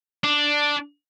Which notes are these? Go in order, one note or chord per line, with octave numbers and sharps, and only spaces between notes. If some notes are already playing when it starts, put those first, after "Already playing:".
D4